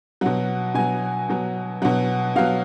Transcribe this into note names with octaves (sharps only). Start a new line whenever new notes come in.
B2 F#3 F#5
B2 F#3 G#5
B2 F#3
B2 F#3 F#5
B2 F#3 F5